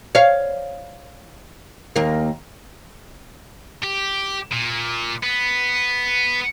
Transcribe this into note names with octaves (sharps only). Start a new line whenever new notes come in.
C#5 F5
D#2 A#3
G4
A#2
B3